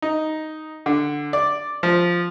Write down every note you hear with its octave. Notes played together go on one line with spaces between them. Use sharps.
D#4
D3
D5
F3